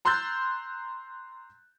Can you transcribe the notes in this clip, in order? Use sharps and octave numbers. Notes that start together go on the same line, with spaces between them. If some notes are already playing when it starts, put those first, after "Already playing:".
A#5 C6 E6 F#6 G6 A6